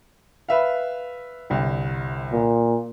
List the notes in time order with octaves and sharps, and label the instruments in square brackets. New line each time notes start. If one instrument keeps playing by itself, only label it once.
[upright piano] B4 E5 F5
G1 C2
[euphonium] A#2